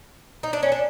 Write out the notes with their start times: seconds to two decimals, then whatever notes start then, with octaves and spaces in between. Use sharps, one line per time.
0.43 D#4
0.53 D4
0.63 C#4
0.72 D4